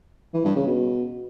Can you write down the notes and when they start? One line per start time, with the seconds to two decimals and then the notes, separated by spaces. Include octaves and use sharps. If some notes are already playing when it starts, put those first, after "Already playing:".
0.34 E3
0.45 G2
0.56 C#3
0.67 B2